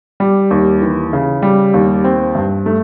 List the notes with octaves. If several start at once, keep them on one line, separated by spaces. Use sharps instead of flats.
G3
D#2
E3
C#3
G3
D#2
C4
G2
A3